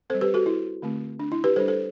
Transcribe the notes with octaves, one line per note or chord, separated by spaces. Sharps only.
G3 C4 A4 C5
G4 B4
F#4 A4
E4
D3 A3 C4
D4
E4
G4 B4
G3 D4 A4 C5
A4 C5